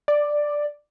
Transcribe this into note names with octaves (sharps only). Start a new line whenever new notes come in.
D5